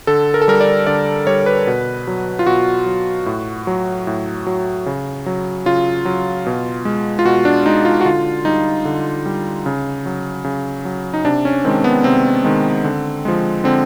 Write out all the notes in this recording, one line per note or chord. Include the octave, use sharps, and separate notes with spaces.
D3 A4
A#4
A4
G3 A#4
D5
D3 D5
G3 C#5
B4
B2
F#3
F4
B2 F#4
F#3
A2
F#3
A2
F#3
C#3
F#3
C#3 F4
F#3
B2
G#3
F4
B2 F#4
D4
G#3 D#4
F4
F#4
D3 F4
G3 D#4
D3
G3
C#3
F#3
C#3
F#3
D#4
C3 D4
C#4
D#3 G#3 C4
B3
C3 C4
D#3 G#3
D3
F3 G#3
D3 C4